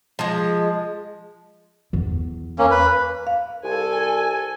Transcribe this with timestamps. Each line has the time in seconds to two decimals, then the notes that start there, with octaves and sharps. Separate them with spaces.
0.19 F3 G#3
1.93 E2
2.59 A#3 C#4
2.71 B4
3.27 F5
3.64 C2 A4 G#5